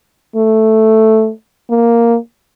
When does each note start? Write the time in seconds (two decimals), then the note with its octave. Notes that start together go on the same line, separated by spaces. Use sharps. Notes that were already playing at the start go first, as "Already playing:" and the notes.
0.36 A3
1.70 A#3